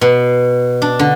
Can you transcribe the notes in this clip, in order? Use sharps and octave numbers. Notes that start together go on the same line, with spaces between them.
B2
D4
D3